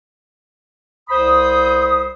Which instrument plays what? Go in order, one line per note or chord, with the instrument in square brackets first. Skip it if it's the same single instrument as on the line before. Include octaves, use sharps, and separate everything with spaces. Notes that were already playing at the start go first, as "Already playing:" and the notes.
[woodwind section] C2 C5 B5 D#6